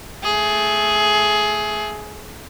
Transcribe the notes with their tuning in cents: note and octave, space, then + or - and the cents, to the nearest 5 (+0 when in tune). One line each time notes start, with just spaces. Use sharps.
A3 +0 G#4 +15